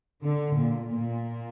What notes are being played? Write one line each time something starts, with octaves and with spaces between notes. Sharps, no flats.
D3
A#2
A#2